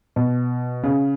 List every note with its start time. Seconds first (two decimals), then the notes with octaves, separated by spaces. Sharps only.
0.16 B2
0.83 C#3